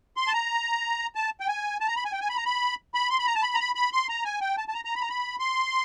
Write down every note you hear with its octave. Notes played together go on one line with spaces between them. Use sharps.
C6
A5
A#5
A5
G5
G#5
A5
A#5
B5
G#5
G5
G#5
B5
A#5
B5
B5
C6
B5
A#5
A5
B5
A#5
B5
B5
C6
A#5
G#5
G5
A5
A5
A#5
A#5
B5
A#5
B5
C6